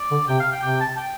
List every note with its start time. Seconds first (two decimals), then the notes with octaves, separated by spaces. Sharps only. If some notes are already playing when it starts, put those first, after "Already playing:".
Already playing: D5
0.11 D3
0.28 C3 G5
0.40 F5
0.52 G5
0.62 C3 G5
0.80 A5
0.97 G5